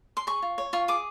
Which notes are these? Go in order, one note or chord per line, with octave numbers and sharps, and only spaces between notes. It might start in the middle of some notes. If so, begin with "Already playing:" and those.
C6
G#4 C#6
F4
C#5
F4 C#6
G#4 D6